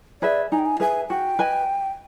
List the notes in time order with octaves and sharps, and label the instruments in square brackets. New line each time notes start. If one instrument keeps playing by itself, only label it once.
[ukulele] G#4 B4 E5 [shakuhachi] D5
[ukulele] D#4 [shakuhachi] G#5
[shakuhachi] G5
G#5
[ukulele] G#4 B4 E5 [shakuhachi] G#5
[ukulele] F#4 [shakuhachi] G5
[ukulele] B4 D#5 G#5